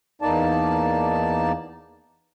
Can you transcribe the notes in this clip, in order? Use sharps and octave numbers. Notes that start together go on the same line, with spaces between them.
E2 A#3 D#4 D5 A5